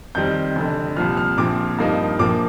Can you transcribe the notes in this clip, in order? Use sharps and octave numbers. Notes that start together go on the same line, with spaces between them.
F2 D#3 G3 C4 G6
F1 F2 D3
C2 A#2 F3 F6
F6
A#1 A#2 F3 C4 D6
G2 F3 A#3 D#4
A#1 A#2 F3 A#3 D6